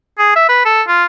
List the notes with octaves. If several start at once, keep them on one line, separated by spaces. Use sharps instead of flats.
G#4
E5
B4
A4
F4